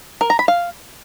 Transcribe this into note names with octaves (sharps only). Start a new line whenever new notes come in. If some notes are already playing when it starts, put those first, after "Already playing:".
A#4
A#5
B5
F5